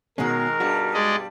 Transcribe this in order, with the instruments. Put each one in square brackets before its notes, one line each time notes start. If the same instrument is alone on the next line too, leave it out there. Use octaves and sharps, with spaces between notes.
[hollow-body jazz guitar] B2 C#4 [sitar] D#3 G#3 [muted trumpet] A#4
[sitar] G2 B2 G3 [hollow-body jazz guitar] F#4
[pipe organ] G#3 D5 D#5